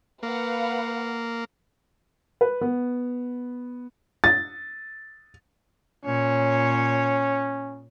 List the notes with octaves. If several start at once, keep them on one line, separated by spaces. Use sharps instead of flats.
A#3 B4 F5 F#5
B4
B3
A6
A#2 C#4 C#5